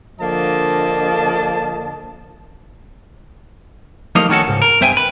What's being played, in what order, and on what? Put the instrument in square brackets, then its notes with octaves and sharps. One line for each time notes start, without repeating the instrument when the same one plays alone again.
[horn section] D3 F3 A#3 D#5 A5
[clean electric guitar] F3 G3 A3 A#3 D#4 F5
D#3 A3 C#4 F#4 A4
C#2 G#2
A#4
G2 B3 C5 E5 G5 G#5
B4